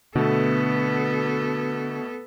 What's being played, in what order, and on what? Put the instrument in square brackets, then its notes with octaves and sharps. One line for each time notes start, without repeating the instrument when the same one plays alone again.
[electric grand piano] B2 A3 [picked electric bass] D3 [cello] B3 A4